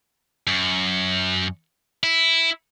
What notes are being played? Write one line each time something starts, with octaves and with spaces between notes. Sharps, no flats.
F#2
E4